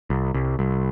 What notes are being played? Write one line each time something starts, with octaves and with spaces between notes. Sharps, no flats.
C2
C2
C2